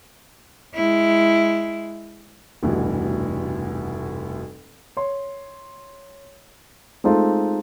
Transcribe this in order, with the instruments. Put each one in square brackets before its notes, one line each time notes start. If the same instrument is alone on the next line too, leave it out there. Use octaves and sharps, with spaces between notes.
[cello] G#3 E4
[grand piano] F1 D2 G2 B2 E3
C#5 C6
G#3 A3 C4 D#4 F4 A4